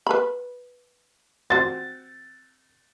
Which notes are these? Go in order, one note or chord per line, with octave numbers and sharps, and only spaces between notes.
B4 B5
C4 F#4 A6